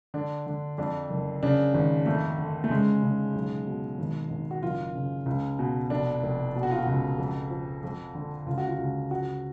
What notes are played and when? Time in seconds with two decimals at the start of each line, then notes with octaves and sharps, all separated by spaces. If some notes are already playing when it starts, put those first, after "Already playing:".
0.14 D3 D4
0.47 D3
0.78 F2 D4
1.10 F#1
1.43 C#3 D4
1.74 G#1
2.06 F2 A3
2.38 D3
2.64 A3
2.70 C#3 G#3
3.03 C#3
3.35 B1
3.67 B2
3.99 G#1
4.30 G#1
4.51 F#4
4.63 F#1 F4
4.95 C#3
5.26 C#2
5.59 B2
5.90 F1 D4
6.23 F1
6.55 B2
6.63 F#4
6.71 F4
6.79 F#4
6.87 C#2
7.18 F2
7.50 F3
7.83 F2
8.15 D3
8.46 C#2 F4
8.58 F#4
8.67 F4
8.78 C#2
9.11 F3 F#4